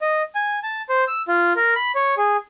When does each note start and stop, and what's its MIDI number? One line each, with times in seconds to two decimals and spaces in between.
0.02 0.22 75
0.35 0.59 80
0.63 0.82 81
0.89 1.04 72
1.08 1.22 88
1.28 1.53 65
1.56 1.74 70
1.76 1.92 83
1.95 2.15 73
2.17 2.37 68